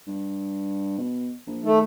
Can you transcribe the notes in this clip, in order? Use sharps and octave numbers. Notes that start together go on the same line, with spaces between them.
G2
B2
A#1
D#3 A3